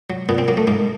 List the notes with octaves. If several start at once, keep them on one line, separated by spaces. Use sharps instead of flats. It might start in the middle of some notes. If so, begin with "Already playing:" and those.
F#3
A#2 B3
C4
F#3 A#3
A3
G#2 A#3